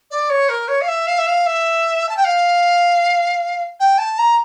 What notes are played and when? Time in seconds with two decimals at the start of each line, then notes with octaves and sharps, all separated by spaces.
0.11 D5
0.30 C#5
0.49 A#4
0.68 C#5
0.81 F5
0.88 E5
1.07 F5
1.18 E5
1.27 F5
1.46 E5
2.09 A5
2.17 G5
2.24 F5
3.80 G5
3.98 A5
4.18 A#5